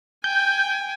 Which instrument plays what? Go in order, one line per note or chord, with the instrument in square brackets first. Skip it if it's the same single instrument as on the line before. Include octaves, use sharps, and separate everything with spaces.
[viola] G5 G#5 [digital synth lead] G6